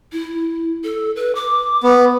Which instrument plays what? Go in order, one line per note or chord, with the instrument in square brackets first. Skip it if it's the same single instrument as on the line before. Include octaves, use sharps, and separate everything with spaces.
[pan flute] E4
A4
B4
D6
[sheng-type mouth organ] B3